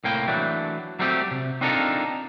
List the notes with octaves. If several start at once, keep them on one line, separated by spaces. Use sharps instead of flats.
C2 A2 A#3 G5
E3 F#3 A3 D4
F#3 G3 A3 C4 G4
C3
C4 D4 D#4 F4 A4 A#4